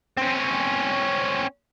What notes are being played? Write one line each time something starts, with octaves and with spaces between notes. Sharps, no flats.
C4 C#4